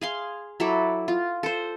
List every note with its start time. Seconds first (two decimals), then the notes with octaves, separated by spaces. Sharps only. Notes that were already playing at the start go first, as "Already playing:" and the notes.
0.01 G#4 F5 C6
0.60 F#3 E4 A4 D5
1.08 F4
1.43 A4 C5